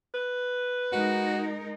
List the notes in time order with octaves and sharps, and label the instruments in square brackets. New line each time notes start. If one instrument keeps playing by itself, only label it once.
[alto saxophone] B4
[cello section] G#3 D#4 A#4 [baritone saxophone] F#4